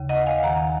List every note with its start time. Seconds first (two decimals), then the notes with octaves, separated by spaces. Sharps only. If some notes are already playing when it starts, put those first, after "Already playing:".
Already playing: D#2 C#3
0.09 D#5 F#5
0.26 F5 G#5
0.43 D#2 D#3 F#5 A#5